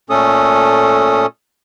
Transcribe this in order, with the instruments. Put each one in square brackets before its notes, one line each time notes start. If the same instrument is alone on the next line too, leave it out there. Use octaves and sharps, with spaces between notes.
[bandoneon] A#2 A3 C#4 A4 D#6